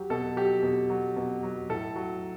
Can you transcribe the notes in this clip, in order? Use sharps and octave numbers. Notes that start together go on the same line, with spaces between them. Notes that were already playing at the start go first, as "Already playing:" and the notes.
Already playing: F#3 G4
B2 A4
F#3 G4
B2
F#3
B2
F#3
A2 A4
F#3